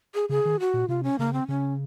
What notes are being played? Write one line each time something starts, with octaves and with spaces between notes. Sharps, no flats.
G#4
C#3 G#4
D#3
F#4
A#2
C3 F4
C#4
C#3 A#3
C4
C#3 C#4